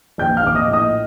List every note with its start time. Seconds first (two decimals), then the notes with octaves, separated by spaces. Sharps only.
0.18 A#1 G5 G6
0.37 F5 F6
0.43 A#1 D6
0.55 D#5 D#6
0.68 A2
0.73 D#5 D#6